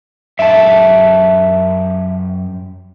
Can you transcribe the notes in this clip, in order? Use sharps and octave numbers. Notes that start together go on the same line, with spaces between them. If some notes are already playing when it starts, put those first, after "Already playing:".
F#2 G4 E5 A5